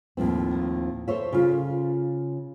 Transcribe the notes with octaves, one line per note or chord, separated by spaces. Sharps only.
D#2 A2 F3 C4
A4 C5 C#5 E5
C#3 F4